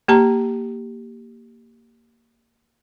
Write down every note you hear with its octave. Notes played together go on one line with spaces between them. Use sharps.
A#3 G4 A5 A#5